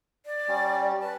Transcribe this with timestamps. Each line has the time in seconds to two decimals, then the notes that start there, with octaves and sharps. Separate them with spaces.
0.26 D5
0.48 G3 C#4
1.02 B4 A5